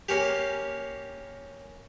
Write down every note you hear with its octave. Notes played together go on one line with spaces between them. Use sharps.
A#3 C#4 G4